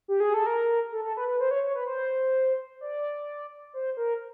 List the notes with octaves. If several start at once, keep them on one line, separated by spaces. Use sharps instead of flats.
G4
G#4
A4
A#4
A4
A4
B4
B4
C5
C#5
C#5
B4
C5
D5
C5
A#4